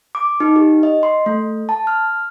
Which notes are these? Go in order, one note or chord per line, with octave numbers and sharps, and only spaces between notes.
D6
D#4
G4
D#5
C6
A3
A5
F6